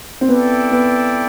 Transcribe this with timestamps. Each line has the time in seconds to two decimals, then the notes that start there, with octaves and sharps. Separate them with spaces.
0.21 C4
0.28 B3 E4 A4 D5 G5
0.71 B3